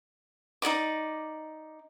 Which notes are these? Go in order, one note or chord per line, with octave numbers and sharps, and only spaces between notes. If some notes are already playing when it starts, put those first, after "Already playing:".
D#4 A4 D5 D6